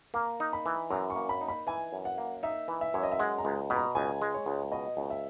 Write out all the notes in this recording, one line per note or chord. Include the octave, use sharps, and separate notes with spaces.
A#3 A#5
D#4
B5
E3
F#2 A#5
C#6
A#3
B5
D#4
B5
E3 G#5
F#2
F#5
A#3
D#4 E5
E3
E5
F#2 C#5
D#5
E5
G#3 F#5
A#5
C#2
B2 B5
A#5
C#2 G#5
G#3
C#5
C#2
B2 D#5
C#2
E5